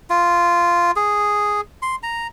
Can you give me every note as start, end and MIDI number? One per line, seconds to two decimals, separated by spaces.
0.10 0.91 65
0.96 1.61 68
1.82 1.96 84
2.03 2.27 82